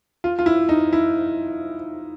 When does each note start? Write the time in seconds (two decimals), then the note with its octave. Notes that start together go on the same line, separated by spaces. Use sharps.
0.24 F4
0.39 F4
0.46 E4
0.69 D#4
0.93 E4